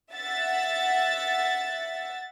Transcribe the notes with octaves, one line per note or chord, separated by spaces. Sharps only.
E5 F#5 A6